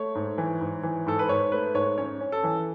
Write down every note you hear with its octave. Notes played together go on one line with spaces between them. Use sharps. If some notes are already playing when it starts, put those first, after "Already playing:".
Already playing: A3 C#5
G#2
E3
G#2
E3
G#2 A4
B4
G#2 C#5
A3 B4
G#2 C#5
C#4 C#5
C#4
A4
E3